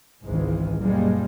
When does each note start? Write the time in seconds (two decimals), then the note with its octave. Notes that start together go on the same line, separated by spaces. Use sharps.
0.25 G#1 C#2 G#2 D#3 E3 G#3
0.78 F#1 A#2 G3 G#3 A#3